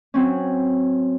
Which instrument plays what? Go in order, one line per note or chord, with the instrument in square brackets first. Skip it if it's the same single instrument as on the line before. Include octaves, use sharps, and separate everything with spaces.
[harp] F#3 C4 C#4